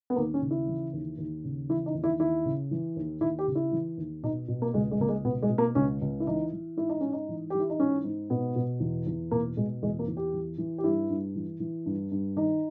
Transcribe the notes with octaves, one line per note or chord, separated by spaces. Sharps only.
B3
D#2 A#3
C#4
C#3
E4
E3
D#2
D#2
C#3
E3 E4
D#4
D#2
E4
D#2 E4
C#3
E3
D#2
D#2 E4
G4
C#3
E4
E3
D#2
B2 D#4
B2
A#3
C#2 G#3
G#3
C#2 A#3
G#3
B2 B3
G#3
B2
A#3
C#2 C#4
C#2
E4
E3 D#4
E3
G#2 E4
D#4
G#2 C#4
D#4
E3
E3 G4
E4
D#4
G#2 C#4
G#2
B2 B3
B2
E2
E2
B2 A#3
B2 G#3
E2 G#3
A#3
E2
G4
E3
E3
G4
G2 E4
G2
E3
E3
G2
G2
D#3 D#4